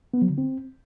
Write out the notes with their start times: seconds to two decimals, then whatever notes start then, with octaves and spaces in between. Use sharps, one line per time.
0.14 B3
0.22 F#3
0.30 D3
0.38 C4